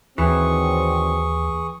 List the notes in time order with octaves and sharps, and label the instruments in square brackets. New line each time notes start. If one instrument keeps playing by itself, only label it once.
[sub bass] D#2 [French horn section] D#3 F#3 C4 [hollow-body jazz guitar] E3 [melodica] G#4 C#6